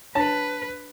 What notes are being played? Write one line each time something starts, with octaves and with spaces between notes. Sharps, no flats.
D4 B4 C#5 A5